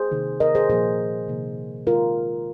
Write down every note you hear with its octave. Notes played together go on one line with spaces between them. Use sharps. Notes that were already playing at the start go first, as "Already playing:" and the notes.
Already playing: G#4 C5
C3 D#3 A#3
A#4 D#5
G#4 C5
A#2 F3 A#3 G#4 C5
C3 D#3 A#3
D#3 G#3 F4 A#4